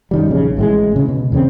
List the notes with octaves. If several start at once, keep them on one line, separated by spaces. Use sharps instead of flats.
F#2 D#3 G3
A#1 C#3
A1 A2 G#3
C#3
B2
E2 C#3 A#3 C4